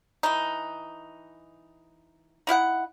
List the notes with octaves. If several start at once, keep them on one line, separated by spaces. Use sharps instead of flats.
E3 D#4
D#4 E4 F5 F#5